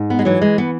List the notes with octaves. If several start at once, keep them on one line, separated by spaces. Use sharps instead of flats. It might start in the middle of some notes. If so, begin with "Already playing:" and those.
Already playing: G#2
B3
G#3
E3 F#3
G#3
B3